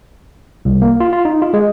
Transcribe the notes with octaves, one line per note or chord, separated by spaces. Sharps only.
C2
A#3
F4
F4
D#4
F4
G#3